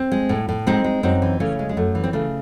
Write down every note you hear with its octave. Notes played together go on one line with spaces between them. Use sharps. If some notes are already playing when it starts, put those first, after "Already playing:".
Already playing: C4
G#3
A2
A2
G#3 C4 D#4
G#3
F#2 C4 D#4
E3
C#3 A3 C#4
G#3
G#3
F#2 A3
E3
C4
C#3 A3